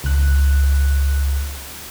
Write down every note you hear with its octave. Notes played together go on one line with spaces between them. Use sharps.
C#2 F#6